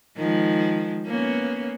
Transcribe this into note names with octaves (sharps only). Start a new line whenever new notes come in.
D#3 F3 G#3
A#3 B3 C#4